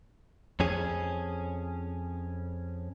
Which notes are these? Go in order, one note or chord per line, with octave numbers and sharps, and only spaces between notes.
F2 C#4 G#4